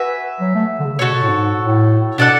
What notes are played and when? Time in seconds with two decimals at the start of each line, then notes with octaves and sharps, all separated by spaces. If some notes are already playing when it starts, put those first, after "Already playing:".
Already playing: F#4 B4 E5 G#5
0.40 F#3
0.55 A3
0.79 D3
0.85 C#3
0.99 B2 F#4 A4 C#5
1.14 B2
1.22 A2
1.29 G#2
1.59 A2
2.18 B2 D4 A4 D5 F#5